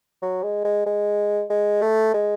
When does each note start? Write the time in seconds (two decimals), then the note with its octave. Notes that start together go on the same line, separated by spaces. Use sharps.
0.22 F#3
0.43 G#3
0.65 G#3
0.86 G#3
1.50 G#3
1.82 A3
2.14 G#3